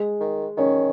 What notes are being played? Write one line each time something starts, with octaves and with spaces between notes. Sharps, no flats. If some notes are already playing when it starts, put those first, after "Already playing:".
Already playing: G#3
D#3
D#3 C#4